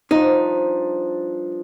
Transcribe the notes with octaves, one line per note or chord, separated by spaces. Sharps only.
G2 F3 D#4